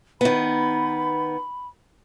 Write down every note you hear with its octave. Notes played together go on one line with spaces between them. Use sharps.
D#3 B3 B5